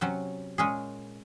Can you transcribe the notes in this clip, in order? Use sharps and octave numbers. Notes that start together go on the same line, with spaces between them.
C3 F#3 C#4
A#2 G#3 C#4 G#4